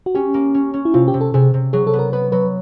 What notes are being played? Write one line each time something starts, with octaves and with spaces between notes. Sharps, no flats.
F#4
C#4 G4
A#3
C#4
C#4
E4
C3 F4
G4
C3
A4
C3 G#4
C3
F#3 G#4
A4
B3
A#4
B3 B4
F#3 B4